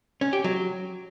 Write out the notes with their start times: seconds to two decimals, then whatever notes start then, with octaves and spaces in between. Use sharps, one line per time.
0.21 C#4
0.33 G4
0.44 F#3